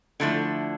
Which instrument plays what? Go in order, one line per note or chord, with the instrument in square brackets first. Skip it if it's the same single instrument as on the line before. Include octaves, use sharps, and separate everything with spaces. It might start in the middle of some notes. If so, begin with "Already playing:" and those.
[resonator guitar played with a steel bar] D3 F3 A3 E4